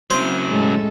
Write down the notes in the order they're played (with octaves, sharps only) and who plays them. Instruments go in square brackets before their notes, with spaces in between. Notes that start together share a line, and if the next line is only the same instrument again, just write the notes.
[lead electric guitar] C#3 F#3 [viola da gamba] C4 E4 [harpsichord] C5
[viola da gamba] A2 C#4 A4 [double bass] G#3